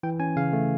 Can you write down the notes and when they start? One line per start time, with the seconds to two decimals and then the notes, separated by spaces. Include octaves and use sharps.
0.03 E3 G5
0.20 C#4 G#5
0.36 C#3 F5
0.53 A3